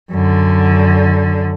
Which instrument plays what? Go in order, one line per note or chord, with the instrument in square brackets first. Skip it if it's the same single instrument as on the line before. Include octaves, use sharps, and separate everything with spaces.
[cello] F#2 D3